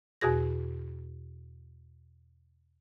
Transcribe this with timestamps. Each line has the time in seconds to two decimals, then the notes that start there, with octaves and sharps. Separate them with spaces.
0.21 E2 B2 F#4 G#4 A#6